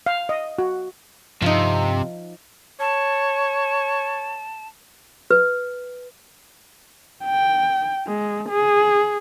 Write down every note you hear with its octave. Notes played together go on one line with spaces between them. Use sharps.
F5
D#5
F#4
G2 C3 F3 D#4
C#5 A5
B4
G5
G#3
G#4